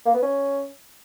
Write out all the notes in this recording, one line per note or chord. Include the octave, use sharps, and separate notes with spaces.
A#3
B3
C#4